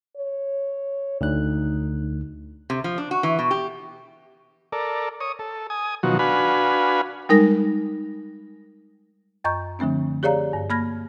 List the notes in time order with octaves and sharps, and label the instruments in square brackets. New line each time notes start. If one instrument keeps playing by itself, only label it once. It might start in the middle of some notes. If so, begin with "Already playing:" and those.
[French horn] C#5
[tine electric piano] D2 D3 F#6 [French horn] D#4
[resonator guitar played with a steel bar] C3
F3
D4
F#4
E3
B2
G4
[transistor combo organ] A4 A#4 D5
C#5 D#6
A4
G#5 D#6
B2 D#3 F3 F#3 F#4
D4 F#4 B4 F5 G#5 B5
[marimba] G3 G#3 D#4 A#4 A#6
F#2 D#5 A#5 C#6 G6
D3 F3 A3 C4 D4
G4 G#4 C#5 D5 F5 A#5
G2
A#3 B5 F6 G#6 A#6